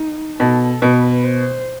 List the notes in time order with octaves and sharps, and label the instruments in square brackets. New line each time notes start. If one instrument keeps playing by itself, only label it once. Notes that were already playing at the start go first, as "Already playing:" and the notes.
Already playing: [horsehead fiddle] D#4
[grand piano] B2 [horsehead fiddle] A4
[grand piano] B2 [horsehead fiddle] B4
[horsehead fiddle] C5